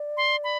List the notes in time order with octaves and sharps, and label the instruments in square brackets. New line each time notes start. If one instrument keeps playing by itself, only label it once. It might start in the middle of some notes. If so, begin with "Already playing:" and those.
Already playing: [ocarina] D5
[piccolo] C6
B5